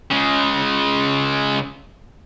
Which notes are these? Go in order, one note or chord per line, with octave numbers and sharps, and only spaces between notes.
C#3 G#3